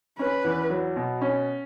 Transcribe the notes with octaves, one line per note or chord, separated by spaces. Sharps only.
C#4 B4
E2
F#3
B2
C#4